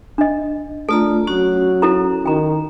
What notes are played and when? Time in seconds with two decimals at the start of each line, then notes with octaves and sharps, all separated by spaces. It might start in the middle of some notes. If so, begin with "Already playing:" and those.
0.18 D4 D#5
0.89 A3 D4 F4 A4 A#5
1.27 F#3 C#4 F#4
1.82 E4 A4 A#5
2.26 D#3 G5 A#5